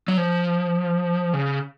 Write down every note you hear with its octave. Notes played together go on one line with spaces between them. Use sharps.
F#3
F3
C#3